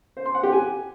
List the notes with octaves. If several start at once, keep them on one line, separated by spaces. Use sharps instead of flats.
C5
C6
F#5
G4
G#5